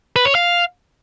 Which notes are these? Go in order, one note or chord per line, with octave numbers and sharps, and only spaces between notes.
B4
C#5
F5